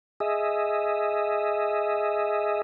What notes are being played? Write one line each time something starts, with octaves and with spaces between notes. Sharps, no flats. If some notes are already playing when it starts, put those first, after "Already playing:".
G#4 D#5 E5